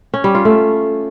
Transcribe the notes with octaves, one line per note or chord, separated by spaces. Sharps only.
C#4
G3
F4
A3